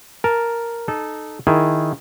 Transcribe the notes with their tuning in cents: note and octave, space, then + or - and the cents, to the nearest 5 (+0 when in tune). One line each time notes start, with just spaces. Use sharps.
A#4 +0 A5 +0
D#4 -20 A4 -20
D#3 +0 E4 +5 G#4 +0